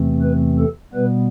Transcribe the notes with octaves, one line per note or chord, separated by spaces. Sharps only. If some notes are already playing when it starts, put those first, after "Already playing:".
Already playing: E2 C3 E3 A3 C4
B4
A4
B2 G3 B3 B4